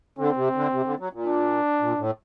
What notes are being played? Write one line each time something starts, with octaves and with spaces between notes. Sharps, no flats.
D3 C4
C3
D3
C3
D3
F#3
A#2
D4
A#2
A2